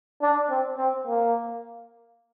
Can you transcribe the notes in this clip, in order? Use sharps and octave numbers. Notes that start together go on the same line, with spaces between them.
D4
C4
C4
A#3